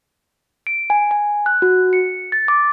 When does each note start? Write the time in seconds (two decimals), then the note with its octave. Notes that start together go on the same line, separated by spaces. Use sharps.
0.67 D7
0.90 G#5
1.11 G#5
1.46 F#6
1.62 F#4
1.93 C#7
2.32 A6
2.48 D6